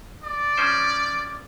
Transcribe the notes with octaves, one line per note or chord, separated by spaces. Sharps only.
D5
F3 C#4 C5